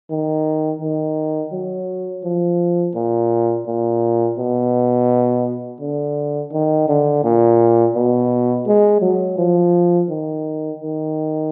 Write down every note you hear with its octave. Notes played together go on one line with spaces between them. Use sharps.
D#3
D#3
F#3
F3
A#2
A#2
B2
D3
D#3
D3
A#2
B2
G#3
F#3
F3
D#3
D#3